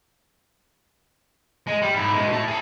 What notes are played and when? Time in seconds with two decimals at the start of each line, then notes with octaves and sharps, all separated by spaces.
1.67 G#3
1.82 G3
1.95 G#2 E4
2.14 B2 G#3
2.32 E4 A5
2.48 G#4 A5